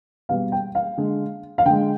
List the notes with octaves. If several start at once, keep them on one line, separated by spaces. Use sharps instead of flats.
B2 G3 F5
G5
F5
D3 G#3
F5
D3 G#3 G5